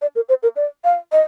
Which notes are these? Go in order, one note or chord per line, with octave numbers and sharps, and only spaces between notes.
D5
A#4
C5
A#4
D5
F5
D#5